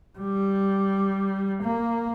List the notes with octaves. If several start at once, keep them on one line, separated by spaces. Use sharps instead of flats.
G3
A#3